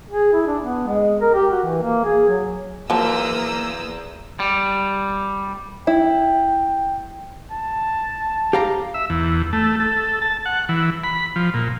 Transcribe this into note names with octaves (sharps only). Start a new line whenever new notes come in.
G#4
E4
D4
B3
G#3
A#4
G4
F#4
E3
A#3
G#4
F#3
E2 F3 F#3 A#3 A#5 D#6 E6
G3
E4 G5
A5
G4 F5 A#5
E5
E2
A3
A4
A5
F#5
E3
B5
F3
A#2